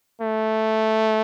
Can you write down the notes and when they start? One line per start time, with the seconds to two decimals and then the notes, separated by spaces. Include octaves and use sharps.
0.21 A3